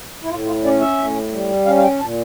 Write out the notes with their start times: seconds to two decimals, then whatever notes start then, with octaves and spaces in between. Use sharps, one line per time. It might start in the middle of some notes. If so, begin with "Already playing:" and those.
0.23 E4
0.29 A2 F4
0.46 F4
0.64 C#4 D5
0.81 E5
0.97 A2
1.32 G3
1.66 C#4 F5
1.77 F5
1.83 G5
2.00 A#2 A5